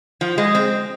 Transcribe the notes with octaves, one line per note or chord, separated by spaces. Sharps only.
F3
G#3
C4